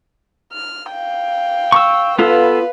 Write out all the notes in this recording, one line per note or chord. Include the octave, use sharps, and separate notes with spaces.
F6
F5 G5
C#6 E6
B3 F4 A4 B4 F5